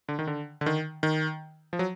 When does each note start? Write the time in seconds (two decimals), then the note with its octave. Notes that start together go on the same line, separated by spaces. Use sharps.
0.09 D3
0.19 D#3
0.27 D3
0.61 D3
0.66 D#3
1.03 D#3
1.73 F3
1.79 F#3